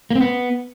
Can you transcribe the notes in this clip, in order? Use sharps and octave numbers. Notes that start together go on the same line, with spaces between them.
A#3
C4
B3